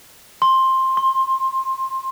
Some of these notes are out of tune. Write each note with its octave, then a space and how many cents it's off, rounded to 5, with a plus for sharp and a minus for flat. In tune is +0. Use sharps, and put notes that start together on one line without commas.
C6 +10
C6 +25